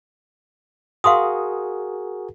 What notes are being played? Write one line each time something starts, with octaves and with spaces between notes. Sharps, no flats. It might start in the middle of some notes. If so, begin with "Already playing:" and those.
F#4 G#4 A#4 F5 C6 D#6